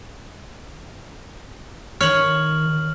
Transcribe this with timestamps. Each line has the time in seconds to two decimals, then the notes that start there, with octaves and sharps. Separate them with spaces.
2.01 D#3 C#5 F6 F#7